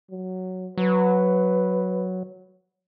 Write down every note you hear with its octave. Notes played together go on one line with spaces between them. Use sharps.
F#3
F#3 B4